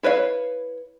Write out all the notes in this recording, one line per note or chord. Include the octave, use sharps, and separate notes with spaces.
E4 B4 C#5 E5 F5